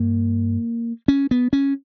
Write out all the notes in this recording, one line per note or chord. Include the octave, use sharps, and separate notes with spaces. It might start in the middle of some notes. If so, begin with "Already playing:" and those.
Already playing: G2 A#3
C#4
B3
C#4